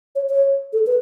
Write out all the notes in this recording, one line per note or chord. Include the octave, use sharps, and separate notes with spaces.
C#5
C#5
A4
B4